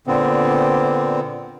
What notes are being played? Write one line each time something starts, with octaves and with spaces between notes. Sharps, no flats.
A#2 D3 B3 C4